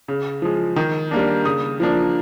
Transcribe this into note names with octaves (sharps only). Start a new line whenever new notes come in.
C#3
F3 G#3
D#3
G3 A#3 D4
C#3 D#6
F3 A#3 D4